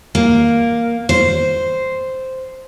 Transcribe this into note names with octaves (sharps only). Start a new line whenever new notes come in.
A#3
C5